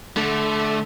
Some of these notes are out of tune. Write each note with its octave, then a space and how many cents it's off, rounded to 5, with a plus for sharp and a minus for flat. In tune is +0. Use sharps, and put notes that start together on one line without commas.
D3 +0 A3 -25